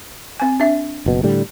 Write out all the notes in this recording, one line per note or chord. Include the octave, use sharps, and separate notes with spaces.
C4 G#5
D4 E5
F#1 B2
A2 D3 G3